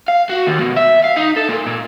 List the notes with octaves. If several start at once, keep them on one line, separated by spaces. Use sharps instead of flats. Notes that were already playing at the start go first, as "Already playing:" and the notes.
F5
F#4
D#2
B2
E5
F5
D#4
A4
A#2
A#2